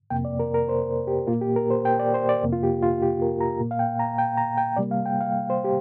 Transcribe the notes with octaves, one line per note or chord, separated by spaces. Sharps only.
F2 C3 A#3 G5
D5
A#4
A#4
C5
G4
A#2 A#3 F4
G4
A#4
C5
G5
D5
C5
D5
F2 C3 A#3
F4
G4
F4
G4
A#4
A#5
A#2 A#3
F5
G5
A#5
G5
A#5
G5
C3 G3 A#3 D5
F5
G5
F5
C5
G4